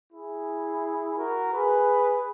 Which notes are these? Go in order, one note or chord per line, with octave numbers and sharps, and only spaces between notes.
E4 G#4
F#4 A#4
G#4 B4